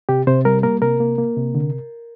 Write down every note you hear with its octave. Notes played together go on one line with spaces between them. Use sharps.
C3 G4
C3 C5
G3 A#4
A#3 A#4
C3 A#4
A#3
A#3
C3
D3